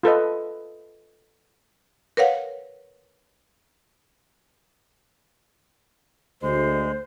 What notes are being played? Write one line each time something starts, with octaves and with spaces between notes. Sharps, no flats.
F4 A4 B4 D#5
A#4 B4 C#5 F5 F#5
D2 G#3 C5